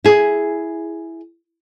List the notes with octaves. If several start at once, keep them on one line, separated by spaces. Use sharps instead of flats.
E4 G#4